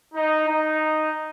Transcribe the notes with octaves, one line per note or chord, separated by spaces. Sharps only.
D#4
D#4